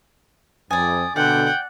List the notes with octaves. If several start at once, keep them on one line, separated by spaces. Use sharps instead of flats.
F2 D5 G#5 D#6
B2 D3 F#5 G5